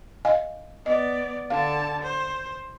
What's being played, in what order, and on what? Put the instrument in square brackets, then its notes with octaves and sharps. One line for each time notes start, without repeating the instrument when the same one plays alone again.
[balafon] D#5 F5 G#5
[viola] B3 D5 [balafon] D#5
[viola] D3 A5 [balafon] F5
[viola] C5